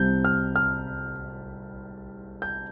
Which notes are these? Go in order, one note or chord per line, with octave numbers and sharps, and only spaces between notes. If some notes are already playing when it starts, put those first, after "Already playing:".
Already playing: C2 C3 G3 C4 G6
F6
F6
G6